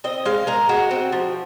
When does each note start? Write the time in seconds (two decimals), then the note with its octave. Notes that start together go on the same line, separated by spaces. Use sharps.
0.04 C4 D#5
0.25 G#3 F5
0.47 G#3 A#4
0.69 G#3 F#4
0.91 C4
1.12 F3